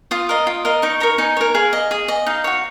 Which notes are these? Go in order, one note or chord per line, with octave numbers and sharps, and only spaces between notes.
F4 D#6
A#4 D#5
F4
A#4 D#5
D#4 C#6
A#4 C#5 A#5
D#4 G#5
A#4 C#5
G#4 F5
D#5
G#4
D#5
D#4 F5
F#4 C#5